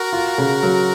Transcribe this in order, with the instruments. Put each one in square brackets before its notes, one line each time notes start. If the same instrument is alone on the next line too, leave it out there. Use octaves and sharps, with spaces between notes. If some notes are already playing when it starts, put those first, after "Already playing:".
Already playing: [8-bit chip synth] F#4 A#4
[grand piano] F4
C#3
F#3